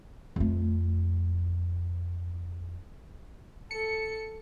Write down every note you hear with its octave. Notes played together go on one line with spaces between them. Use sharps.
F2 A3
A4 C#7